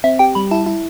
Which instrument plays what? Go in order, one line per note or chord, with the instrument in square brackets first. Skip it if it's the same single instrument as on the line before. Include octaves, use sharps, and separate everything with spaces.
[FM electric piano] C4 [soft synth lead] E5
[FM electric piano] G4 [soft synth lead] G5
[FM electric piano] G3 [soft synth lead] B5
[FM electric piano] E4 [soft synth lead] A5
[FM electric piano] E4